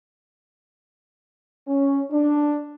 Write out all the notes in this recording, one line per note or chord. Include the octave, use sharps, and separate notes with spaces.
C#4
D4